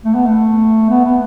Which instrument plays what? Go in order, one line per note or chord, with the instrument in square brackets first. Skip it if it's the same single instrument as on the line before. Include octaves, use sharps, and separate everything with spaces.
[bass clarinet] A3
B3
A3
B3
B3